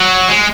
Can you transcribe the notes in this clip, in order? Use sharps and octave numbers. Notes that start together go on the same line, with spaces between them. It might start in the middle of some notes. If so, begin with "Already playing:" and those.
Already playing: F#3
G#3